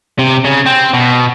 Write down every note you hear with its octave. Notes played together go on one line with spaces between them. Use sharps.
C3
C#3
C4
B2